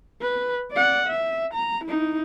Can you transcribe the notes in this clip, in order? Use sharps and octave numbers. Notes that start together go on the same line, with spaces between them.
B4
D5 F#5
E5
A#5
D#4 E4